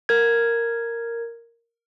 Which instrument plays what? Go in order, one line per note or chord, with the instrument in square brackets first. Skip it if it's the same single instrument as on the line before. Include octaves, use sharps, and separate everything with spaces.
[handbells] A#4 G#6